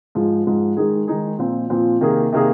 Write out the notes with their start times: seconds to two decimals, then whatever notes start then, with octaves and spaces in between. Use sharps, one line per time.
0.15 G#2 F3 G#3
0.47 G#2 F3 G#3
0.77 D#3 G#3 D#4 G#4
1.08 D#3 G#3 D#4 G#4
1.38 A#2 F3 C4
1.70 A#2 F3 C4
2.01 C3 D#3 A#3 G#4
2.32 C3 D#3 A#3 G#4